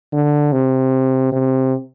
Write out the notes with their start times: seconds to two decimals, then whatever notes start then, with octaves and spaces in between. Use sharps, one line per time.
0.13 D3
0.52 C3
1.32 C3